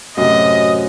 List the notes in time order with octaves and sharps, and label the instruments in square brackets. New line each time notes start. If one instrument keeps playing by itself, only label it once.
[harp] F#2 A2 C3 [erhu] D#5